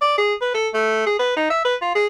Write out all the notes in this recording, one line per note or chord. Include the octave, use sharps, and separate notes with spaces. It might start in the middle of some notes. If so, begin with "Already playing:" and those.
D5
G#4
B4
A4
A3
G#4
B4
D#4
E5
B4
F4
G#4